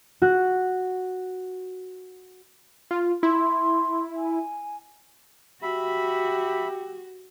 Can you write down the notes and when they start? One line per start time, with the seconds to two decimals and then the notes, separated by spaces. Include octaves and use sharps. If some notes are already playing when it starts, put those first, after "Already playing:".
0.22 F#4 F#6
2.91 F4
3.23 E4 C6
4.16 G#5
5.62 F#4 G4 E5 B5